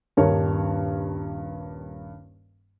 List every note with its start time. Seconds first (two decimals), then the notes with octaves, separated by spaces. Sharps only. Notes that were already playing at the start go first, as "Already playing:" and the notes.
0.17 D#1 G2 A#4 C#5